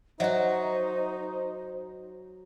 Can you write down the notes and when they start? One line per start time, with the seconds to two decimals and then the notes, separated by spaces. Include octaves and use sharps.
0.20 F#3 D#4 F#4 C5 C#5 D#5 E5